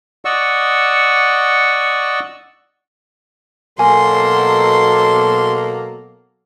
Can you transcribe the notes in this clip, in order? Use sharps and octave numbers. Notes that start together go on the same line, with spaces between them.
D5 D#5 F#5 C#6 E6
B2 F#3 A#3 A4 G#5 C6